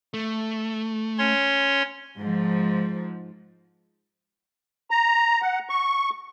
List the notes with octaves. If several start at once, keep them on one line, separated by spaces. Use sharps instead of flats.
A3
C#4 C#5 C6
G#2 F3
A#5
F#5
C#6